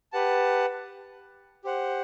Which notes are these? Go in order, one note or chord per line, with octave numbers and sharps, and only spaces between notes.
G4 B4 F#5 A5
G4 C5 F#5